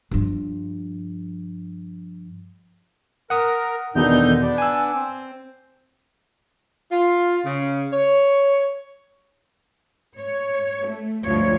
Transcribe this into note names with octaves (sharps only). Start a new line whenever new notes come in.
G2 F3
A#4 F#5 D#6
E2 B2 D3 D#3 D#4 G6
B3 D4
G#5 E6
C4
F4
C#3
C#5
C#5
A3
D2 G2 F3 F4 C#5